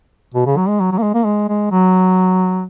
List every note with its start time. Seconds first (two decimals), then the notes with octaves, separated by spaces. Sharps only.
0.34 B2
0.46 C#3
0.57 F#3
0.68 G#3
0.80 F#3
0.92 F#3
0.98 A#3
1.02 G#3
1.14 A#3
1.25 G#3
1.49 G#3
1.71 F#3